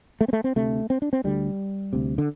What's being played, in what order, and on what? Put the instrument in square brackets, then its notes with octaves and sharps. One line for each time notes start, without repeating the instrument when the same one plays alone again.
[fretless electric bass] A3
C4
A3
C4
D2 C3 A3
C4
D4
C4
D2 D3 G3
D2 C3
D3